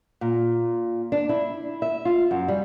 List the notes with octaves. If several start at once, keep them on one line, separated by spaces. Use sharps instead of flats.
A#2
D4
E4
E5
F4
F#2
G3